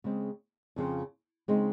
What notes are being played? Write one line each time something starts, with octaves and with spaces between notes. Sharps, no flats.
C#3 G#3 C4
F2 C#3 F3 C4
C#3 G#3 C4 D#4